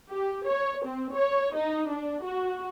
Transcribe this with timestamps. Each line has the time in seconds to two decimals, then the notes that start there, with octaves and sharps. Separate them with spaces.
0.10 G4
0.48 C#5
0.85 C4
1.15 C#5
1.57 D#4
1.90 D4
2.24 F#4